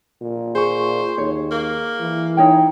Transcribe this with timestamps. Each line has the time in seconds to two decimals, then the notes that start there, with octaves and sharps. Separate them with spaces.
0.22 A#2
0.55 G#4 C5 C#6
1.18 D#2 C#5
1.51 A#3
2.00 E3
2.37 D#4 C#5 G5